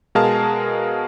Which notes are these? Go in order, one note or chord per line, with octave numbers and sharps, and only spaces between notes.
B2 G#3 G#4 A#4 F5 A5